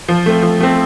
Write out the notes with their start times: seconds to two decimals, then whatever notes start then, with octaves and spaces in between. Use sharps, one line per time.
0.08 F3
0.26 A3 C4
0.42 F3
0.60 A3 C4